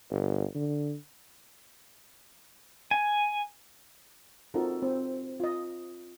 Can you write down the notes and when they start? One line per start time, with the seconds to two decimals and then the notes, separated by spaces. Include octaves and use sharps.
0.10 G1
0.55 D3
2.91 G#5
4.54 C4 D#4 F4 F#4 A4 A#4
4.82 C4
5.40 F4 D#5